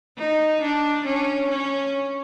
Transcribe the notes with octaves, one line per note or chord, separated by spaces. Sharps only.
D#4
D4
C#4
C#4